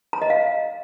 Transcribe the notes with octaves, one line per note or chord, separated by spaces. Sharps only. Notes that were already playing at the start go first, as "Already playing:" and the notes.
A#5
D#5
F5